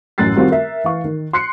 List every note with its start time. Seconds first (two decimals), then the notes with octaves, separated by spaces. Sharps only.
0.18 A1 F#2 F#6 A6 C7
0.36 D#3 G3 C4 F4 F#4
0.51 A#4 E5
0.84 E3 F5 C#6
1.04 D#3
1.33 C6 F#6 C7 C#7